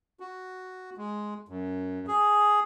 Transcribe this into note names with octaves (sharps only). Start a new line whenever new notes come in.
F#4
G#3
F#2
G#4